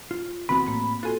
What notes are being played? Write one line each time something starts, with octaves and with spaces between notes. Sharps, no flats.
F4
C2 E3 B3 C4 F#4 B5
A2 A#3
F4 F#4 A4 G#5 C6